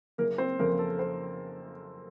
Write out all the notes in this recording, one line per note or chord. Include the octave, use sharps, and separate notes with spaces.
F#1 A#3 A#4
C4 C5
F2 C#3 A#3 A#4
A4
C5